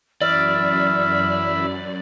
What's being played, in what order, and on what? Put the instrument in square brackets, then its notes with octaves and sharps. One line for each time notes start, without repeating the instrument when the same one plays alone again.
[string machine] F#2 [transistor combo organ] E3 E5 B5 [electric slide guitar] D5 [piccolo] F6